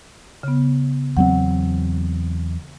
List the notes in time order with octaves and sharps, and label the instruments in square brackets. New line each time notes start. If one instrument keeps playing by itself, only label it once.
[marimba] C#3 B3
[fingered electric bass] E2 F#3 C4 [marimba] F#5